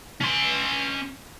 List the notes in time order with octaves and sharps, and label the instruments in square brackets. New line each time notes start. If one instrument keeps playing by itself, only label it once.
[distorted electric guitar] C#4 C6